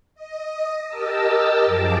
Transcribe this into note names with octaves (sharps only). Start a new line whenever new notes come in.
D#5
G4 A#4 D#5 A5 E6
F#2 F3 G#4 A5 D6